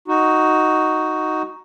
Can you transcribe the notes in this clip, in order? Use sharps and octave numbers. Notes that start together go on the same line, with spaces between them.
D#4 F#4